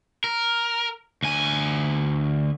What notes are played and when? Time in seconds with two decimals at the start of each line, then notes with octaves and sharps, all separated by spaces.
0.24 A#4
1.23 D2 G#5